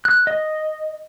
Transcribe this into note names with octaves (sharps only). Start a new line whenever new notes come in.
F#6
D#5